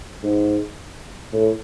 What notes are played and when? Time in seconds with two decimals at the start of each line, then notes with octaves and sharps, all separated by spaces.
0.24 G#2
1.33 A2